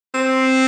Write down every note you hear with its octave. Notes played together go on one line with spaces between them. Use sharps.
C4